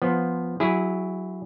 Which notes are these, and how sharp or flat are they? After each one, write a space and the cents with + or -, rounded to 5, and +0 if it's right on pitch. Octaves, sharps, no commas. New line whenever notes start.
F3 +0 B3 +0 C5 +0
F#3 +0 E4 +0 G#4 -25